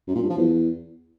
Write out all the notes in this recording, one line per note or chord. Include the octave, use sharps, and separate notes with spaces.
F#2
A#2
G2
F3
E2